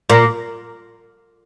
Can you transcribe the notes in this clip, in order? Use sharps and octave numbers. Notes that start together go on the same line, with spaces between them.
A#2